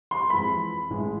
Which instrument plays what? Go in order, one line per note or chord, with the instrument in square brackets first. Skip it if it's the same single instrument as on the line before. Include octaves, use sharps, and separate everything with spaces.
[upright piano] C6
[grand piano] F2 E3 G#3 [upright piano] B5
[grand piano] A1 A2 G#3